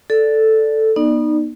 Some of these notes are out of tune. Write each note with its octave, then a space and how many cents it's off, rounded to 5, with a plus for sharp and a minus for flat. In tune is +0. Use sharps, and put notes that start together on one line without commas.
A4 +0 D5 +0
B3 -35 D#4 -25 D5 +25